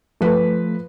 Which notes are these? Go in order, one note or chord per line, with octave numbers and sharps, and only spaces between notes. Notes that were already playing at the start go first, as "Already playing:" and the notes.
F3 A3 B4